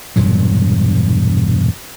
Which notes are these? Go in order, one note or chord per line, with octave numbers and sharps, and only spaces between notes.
E1 G2 A#2 F#3